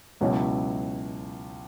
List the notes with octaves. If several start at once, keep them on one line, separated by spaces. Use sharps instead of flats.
C#2 B2 F#3 C#4 E4